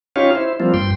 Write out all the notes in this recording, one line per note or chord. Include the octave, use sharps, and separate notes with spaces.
C#4 D#4 F4 G4 C#5 F5
E4 C5
F3 G3 A#3 C4 F4
G2 G5 C6